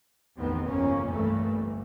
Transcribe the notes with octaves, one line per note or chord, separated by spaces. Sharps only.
A1 E2 D#3 B3 C4
G1 F2 C#3 A#3 C#4
C2 G2 E3 A3 A#3
G1